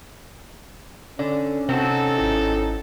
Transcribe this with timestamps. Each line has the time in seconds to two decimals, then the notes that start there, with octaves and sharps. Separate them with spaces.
1.19 D3 C#4 D5
1.69 C3 C4 D#4 F#4 A4
2.18 G#1 E4